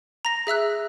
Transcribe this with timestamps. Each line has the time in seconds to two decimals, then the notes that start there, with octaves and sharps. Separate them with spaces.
0.25 A#5 A#6
0.47 G#4 E5 E6 F#6